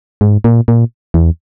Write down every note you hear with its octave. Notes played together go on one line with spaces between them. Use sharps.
G#2
A#2
A#2
E2